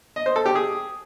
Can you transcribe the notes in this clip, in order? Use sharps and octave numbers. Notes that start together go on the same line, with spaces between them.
D#5
C5
A4
G4
G#4